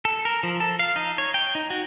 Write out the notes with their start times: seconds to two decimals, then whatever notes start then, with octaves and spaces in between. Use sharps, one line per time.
0.05 A4
0.25 A#4
0.43 F3
0.60 A4
0.79 F5
0.96 D#4
1.18 C#5
1.34 G5
1.55 D#4
1.70 F#4